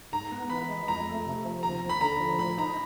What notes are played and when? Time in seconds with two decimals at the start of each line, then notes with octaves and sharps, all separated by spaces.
0.13 G#2 A#5
0.31 B3
0.50 E3 B5
0.69 G#3
0.88 F2 A#5
1.07 A3
1.26 C3
1.45 F3
1.63 D#2 A#5
1.82 D#2
1.89 B5
2.01 D3 A#5
2.20 F3
2.39 A2 B5
2.58 D#4 A#5